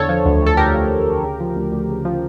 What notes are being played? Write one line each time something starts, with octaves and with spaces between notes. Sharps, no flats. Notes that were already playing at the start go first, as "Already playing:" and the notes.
Already playing: E2 D3 A4 C#5
F3
D2
D2 A4
D3 G4 A#4
F3
D2
D2
C#3
F3
D2
D2
C#3
F3